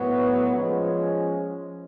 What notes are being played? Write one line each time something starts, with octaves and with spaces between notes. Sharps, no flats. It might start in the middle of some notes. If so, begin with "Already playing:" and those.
Already playing: A2 F#3 B3
F3 G#3 C#4